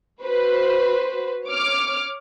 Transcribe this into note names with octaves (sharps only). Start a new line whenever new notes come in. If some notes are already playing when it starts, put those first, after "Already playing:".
F#4 B4 C5
C#5 D6 F6